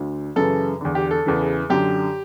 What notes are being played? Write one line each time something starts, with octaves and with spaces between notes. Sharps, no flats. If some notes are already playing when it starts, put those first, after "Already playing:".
Already playing: D2 D3
F#2 C#3 E3 A4
E2 D3
G4
A4
E2 C#3 E3
F#2 D3 G4